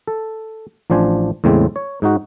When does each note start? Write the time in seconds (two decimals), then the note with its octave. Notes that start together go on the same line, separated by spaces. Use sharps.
0.07 A4
0.90 A1 F3 D4 C5 G#5
1.44 E2 A2 C#3 G#3 C4
1.76 C#5
2.02 G#2 D#4 F#4